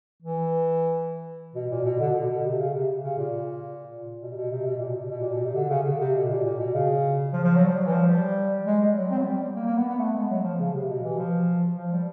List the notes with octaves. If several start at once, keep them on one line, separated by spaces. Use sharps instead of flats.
E3
B2
A#2
B2
D3
B2
B2
C3
C#3
C3
C#3
A#2
B2
C3
B2
C3
B2
A#2
C3
B2
B2
A#2
B2
C3
D3
C#3
D3
C3
B2
A#2
A#2
B2
C#3
F3
F3
F#3
G3
F#3
E3
F3
G3
G#3
G3
F#3
C4
F#3
G3
G3
A#3
A#3
B3
B3
A3
G#3
F#3
F3
C#3
C3
B2
E3
F3
F3
G3